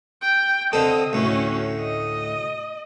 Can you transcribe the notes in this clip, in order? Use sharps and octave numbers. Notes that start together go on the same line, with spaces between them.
G5
D3 C4 A4 D#5
D2 A2 C#4 F#4
D#5